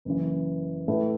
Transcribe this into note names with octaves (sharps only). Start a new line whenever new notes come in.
F#1 F#2 E3
A2 A3 E4 B4